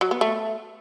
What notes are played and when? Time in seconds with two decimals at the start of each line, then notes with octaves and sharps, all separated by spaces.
0.01 F#3
0.11 B3
0.21 A3